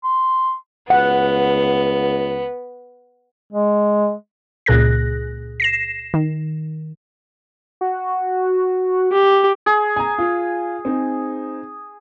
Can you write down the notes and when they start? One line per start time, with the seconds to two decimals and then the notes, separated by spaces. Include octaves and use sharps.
0.04 C6
0.90 C#2 B3 F#5
3.53 G#3
4.66 C#2 A#2 G#4 F#6 A#6
5.60 A#6 C7 E7
6.14 D#3
7.81 F#4
9.11 G4
9.66 G#4
9.96 G#5 A#5
10.18 F4
10.85 C4 D#4